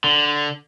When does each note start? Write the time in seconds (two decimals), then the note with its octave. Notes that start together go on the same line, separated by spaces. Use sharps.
0.04 D3